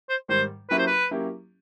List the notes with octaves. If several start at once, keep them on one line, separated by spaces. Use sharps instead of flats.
C5
G#2 D#3 G3 C5
F#3 A#3 C#4 E4 G4 B4
C5
B4
F#3 A#3 C#4 E4 G4